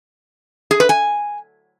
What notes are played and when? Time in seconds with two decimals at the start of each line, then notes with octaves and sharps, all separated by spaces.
0.71 G#4
0.80 B4
0.89 G#5